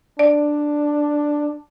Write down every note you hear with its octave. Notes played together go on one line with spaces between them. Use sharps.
D4 D5